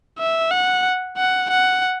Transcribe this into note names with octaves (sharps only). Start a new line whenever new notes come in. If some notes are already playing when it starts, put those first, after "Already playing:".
E5
F#5
F#5
F#5